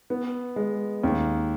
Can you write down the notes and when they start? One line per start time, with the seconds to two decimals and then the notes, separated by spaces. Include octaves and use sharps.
0.10 B3
0.56 G#3
1.03 D#2